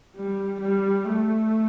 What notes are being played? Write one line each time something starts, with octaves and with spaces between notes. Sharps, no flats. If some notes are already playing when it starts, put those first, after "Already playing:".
G3
G3
A3